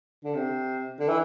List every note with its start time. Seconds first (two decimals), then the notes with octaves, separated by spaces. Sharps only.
0.24 D3
0.35 C3
1.00 D3
1.09 E3